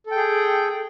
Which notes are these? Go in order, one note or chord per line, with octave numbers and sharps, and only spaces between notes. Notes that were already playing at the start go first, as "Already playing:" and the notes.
G#4 A4 G5